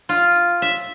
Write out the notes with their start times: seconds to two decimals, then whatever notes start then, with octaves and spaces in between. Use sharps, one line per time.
0.09 F4
0.62 E5